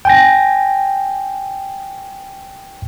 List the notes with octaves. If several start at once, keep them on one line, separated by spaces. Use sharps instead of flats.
G5 G#5 A#6